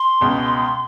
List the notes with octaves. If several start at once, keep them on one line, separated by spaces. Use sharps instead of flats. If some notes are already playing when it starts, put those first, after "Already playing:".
Already playing: C6
C#2 B2 G#3